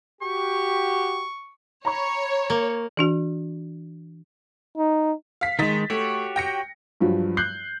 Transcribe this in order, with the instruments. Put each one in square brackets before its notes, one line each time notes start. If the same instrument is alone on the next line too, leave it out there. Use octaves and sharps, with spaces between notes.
[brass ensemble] F#4 G4 [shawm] C#6
[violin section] C#5 [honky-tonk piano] A#5 B5 C#6
[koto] A#3
[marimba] E3 D4 F#4
[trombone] D#4
[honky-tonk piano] F5 B6
[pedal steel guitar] D#3 G#3 [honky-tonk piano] D#4 A6 B6
[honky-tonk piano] A3 [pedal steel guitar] F#4 G4 C#5
[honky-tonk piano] G5 A#6 C#7
[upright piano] G2 F3 F#3
F#6 G6 C7